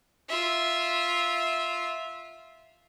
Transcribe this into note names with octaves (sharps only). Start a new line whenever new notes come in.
F4 E5